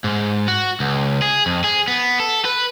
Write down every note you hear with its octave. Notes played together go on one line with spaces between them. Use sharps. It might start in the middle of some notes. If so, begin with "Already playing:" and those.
G#2
F#4
C#2
G#4
F2
G#4
B3
A4
B4